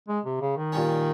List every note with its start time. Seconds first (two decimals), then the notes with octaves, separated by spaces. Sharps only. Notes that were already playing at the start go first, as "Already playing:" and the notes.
0.08 G#3
0.25 C3
0.41 C#3
0.57 D#3
0.72 A#2 G3 C#4